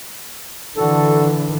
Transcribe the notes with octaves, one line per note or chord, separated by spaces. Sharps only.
D3 E3 D4 F#4 A4